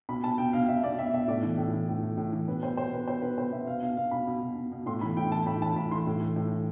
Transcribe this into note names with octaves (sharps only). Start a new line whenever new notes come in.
B2 B5
B2 A5
B2 G5
B2 F5
B2 E5
B2 D5
B2 E5
B2 E5
A2 D5
E3
A2
E3
A2
E3
A2
E3
B2 B4
B2 C5
B2 C5
B2 B4
B2 C5
B2 B4
B2 C5
B2 E5
B2 F5
B2 F5
B2 F5
B2 B5
B2
B2
B2
B2
A2 C6
E3 B5
A2 G5
E3 A5
A2 B5
E3 A5
A2 B5
E3 C6
A2
E3
A2
E3